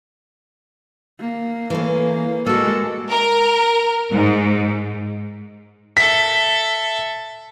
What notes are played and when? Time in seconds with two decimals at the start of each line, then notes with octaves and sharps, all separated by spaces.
1.20 A#3
1.70 E3 A3 C#4
2.46 G#3 A#3 F#4 A4
3.10 A#4
4.11 G#2
5.97 A4 E5 B6